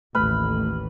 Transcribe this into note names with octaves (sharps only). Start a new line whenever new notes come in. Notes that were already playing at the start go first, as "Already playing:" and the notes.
A1 D#2 A3 B4 B5 F6